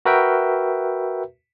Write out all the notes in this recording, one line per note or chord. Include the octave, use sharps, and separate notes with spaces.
F#4 A#4 B4 E5 G5